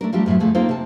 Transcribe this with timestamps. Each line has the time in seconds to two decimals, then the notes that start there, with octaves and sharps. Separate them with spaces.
0.01 A3 D4 A#4
0.13 F3 G3 A3 D4 G4
0.26 F#2 A2 C4 E5
0.40 D2 F3 A3 G#4
0.55 A#3 C4 D#4 F4 A4 C5
0.69 C3 A5